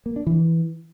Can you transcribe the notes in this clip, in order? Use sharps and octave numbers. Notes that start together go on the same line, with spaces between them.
A#3
D4
E3